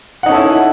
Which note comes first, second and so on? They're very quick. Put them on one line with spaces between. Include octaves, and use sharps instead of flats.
F#5 D#4 C#4 A4 E4